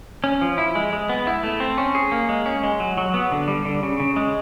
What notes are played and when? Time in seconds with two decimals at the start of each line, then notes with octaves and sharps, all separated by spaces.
0.24 C#4
0.41 F3
0.58 E4
0.75 G#3
0.93 G#3
1.09 B3
1.27 E4
1.43 A3
1.60 C4
1.78 C#4
1.95 G#4
2.12 A#3
2.29 G#3
2.46 C#4
2.63 G#3
2.80 F#3
2.97 F#3
3.14 B3
3.32 D3
3.48 G3
3.65 D3
3.83 C#3
4.00 C#3
4.16 G#3